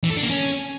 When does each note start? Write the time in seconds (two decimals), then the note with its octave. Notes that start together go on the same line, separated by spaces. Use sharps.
0.04 E3
0.10 A4
0.17 D4
0.23 A#3
0.30 C#4